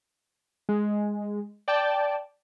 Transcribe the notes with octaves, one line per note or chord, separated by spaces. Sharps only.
G#3
D5 G5 A5